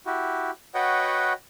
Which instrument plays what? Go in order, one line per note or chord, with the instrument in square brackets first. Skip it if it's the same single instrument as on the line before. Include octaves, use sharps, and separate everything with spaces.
[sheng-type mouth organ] E4 F#4 G4
F#4 B4 C#5 D#5 F#5 G5